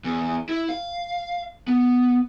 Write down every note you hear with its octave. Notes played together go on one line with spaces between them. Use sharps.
E2
E4
F5
B3